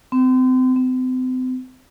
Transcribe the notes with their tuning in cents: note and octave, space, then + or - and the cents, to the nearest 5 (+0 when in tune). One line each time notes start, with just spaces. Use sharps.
C4 -35
C4 -40